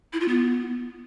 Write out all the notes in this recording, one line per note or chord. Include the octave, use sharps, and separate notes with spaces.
E4
F4
B3